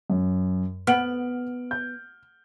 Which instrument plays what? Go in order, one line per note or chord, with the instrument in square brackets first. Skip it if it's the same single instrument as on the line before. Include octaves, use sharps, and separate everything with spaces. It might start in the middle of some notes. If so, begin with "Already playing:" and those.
[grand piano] F#2
[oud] B3 [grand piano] F6 D7 F#7
[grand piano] G6